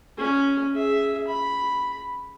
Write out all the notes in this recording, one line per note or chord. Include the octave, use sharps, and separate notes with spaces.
C#4
G#4 E5
B5